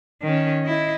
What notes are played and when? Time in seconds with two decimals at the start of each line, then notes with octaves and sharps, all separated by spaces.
0.22 D#3 C#4
0.64 E4 D#5